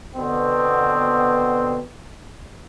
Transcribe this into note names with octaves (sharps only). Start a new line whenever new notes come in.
B2 D3 B3 C4